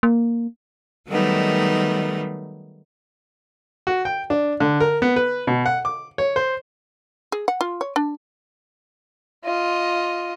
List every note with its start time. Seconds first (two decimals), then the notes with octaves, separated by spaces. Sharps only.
0.03 A#3
1.07 D#3 F#3 G3 A3 B3 D#4
3.87 F#4
4.05 G5
4.30 D4
4.60 D3
4.80 A#4
5.02 B3
5.16 B4
5.47 B2
5.66 F#5
5.85 D6
6.18 C#5
6.36 C5
7.32 G#4
7.48 F#5
7.61 F4
7.81 C#5
7.96 D4
9.45 F4 D#5